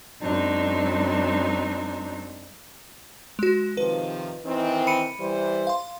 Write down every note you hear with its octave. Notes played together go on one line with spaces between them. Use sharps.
F#2 G#3 C4 D4 D#4
G#3 F#4
C3 D#3 F3 B4
D#3 E3 C4
B5 C#7 D#7
E3 G3 C5
F5 C6